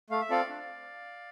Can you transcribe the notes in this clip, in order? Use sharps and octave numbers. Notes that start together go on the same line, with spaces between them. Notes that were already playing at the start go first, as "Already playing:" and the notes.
A3 F5
E5
C4 F4 A4 D5 F5
D4